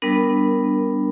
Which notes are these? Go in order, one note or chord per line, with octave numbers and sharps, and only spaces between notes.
G3 B3 D4 A#4